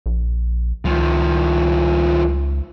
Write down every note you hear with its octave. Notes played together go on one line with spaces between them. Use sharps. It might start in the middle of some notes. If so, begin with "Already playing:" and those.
A#1
C#2 D#3 F3